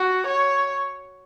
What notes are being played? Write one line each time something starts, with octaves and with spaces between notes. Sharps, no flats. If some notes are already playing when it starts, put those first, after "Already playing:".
Already playing: F#4
C#5